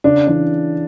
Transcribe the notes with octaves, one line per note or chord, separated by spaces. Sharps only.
C#3 D4
E3 D4